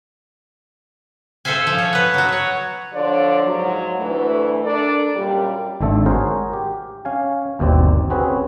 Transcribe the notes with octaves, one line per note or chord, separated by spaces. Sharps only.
A4 C5 E5 F5 G#5
F3
C#5
B3 B4
F#3 F#4
F#4 C#5
D3 F3 F4 C#5 D5
G#2 F3 F#3
D2 E3 A3
D4 A4 A#4 D5
F#2 A#2 G3
G#1 D3 A3 A4
F#4 G#4 A#4 C5 C#5
G4
C#4 F5 G#5
G1 D#2 B2 C4 D5
C4 C#4 F#4 G#4 B4